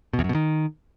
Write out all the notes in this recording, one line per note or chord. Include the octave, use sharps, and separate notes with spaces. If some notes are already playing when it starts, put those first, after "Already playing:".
B2
E2
F#2
B2
D#3